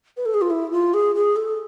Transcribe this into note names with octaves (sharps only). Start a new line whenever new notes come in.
B4
A4
G#4
F4
E4
F4
G#4
G#4
A4